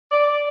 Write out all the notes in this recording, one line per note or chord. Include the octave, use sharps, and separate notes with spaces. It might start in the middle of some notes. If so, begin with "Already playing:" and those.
D5